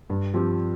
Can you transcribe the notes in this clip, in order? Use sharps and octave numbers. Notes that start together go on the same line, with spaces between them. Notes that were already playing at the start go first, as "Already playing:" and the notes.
G2
F3 C4 G4